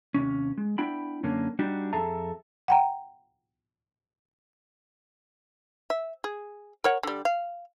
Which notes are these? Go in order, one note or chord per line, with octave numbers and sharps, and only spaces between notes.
D#2 C3 C#4
G#3
B3 D4 E4 G5 B5
F#2 D3 A#3 C#4
G3 D4 D#4 F#4 G4
F2 G#4 A4 E5 A5 A#5
F#5 G5 A#5
E5
G#4
A#4 C#5 F#5
D3 G3
F5